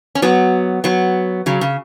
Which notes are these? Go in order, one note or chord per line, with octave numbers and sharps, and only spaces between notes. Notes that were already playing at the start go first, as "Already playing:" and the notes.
C#4
F#3 B3
F#3 B3
C#3 F#3
C#3